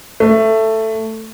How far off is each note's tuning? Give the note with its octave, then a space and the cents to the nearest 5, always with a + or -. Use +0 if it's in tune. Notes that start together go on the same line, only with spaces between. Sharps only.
A3 +10